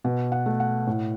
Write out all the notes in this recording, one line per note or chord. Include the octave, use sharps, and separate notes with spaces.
B2
F#5
A3
F#5
A2